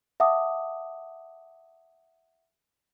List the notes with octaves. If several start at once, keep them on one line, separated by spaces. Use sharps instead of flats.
E5 F#5 A5 D6 D#6